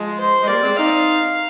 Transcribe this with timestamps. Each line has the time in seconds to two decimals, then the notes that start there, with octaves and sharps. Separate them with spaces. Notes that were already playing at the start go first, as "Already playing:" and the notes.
Already playing: F3 G#3
0.19 C5
0.42 G#3
0.48 G3 A#3 D5
0.63 G#3 C4
0.77 C4 D#4 F5